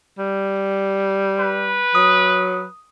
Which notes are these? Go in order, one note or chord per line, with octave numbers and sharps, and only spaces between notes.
G3
B4
F#3 D#6